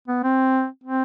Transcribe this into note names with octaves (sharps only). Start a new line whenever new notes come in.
B3
C4
C4